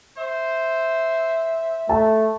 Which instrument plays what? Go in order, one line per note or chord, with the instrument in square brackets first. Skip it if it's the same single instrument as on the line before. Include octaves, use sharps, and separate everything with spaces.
[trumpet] C5 [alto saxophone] E5
[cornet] A3 [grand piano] A5